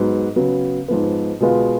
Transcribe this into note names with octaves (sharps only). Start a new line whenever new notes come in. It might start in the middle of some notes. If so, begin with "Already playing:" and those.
Already playing: G#2 F#3 B3
C#3 F#3 B3
G#2 F3 B3
B2 G#3 B3 F4